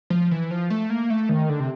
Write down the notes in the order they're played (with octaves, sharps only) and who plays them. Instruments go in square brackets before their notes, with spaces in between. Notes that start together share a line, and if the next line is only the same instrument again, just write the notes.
[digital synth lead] F3
E3
F3
A3
A#3
A3
D#3
D3
C3